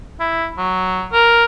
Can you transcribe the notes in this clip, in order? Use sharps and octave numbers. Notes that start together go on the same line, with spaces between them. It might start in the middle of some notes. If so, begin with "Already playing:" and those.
E4
F#3
A#4